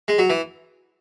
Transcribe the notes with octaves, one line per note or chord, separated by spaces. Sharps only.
G#3
F#3
E3